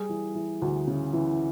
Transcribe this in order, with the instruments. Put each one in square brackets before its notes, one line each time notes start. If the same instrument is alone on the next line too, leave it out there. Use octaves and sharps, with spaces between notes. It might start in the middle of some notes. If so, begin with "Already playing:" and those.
Already playing: [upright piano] G3 G#4
E3
E3
D2
C#3
E3